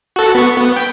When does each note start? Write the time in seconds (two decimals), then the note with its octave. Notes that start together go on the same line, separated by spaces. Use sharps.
0.16 F#4 A4
0.35 B3 C#6
0.57 B3
0.76 G5